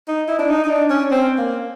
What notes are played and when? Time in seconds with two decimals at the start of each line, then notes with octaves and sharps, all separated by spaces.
0.08 D#4
0.28 E4
0.39 D4
0.50 D#4
0.64 D#4
0.70 D4
0.90 C#4
1.12 C4
1.38 A#3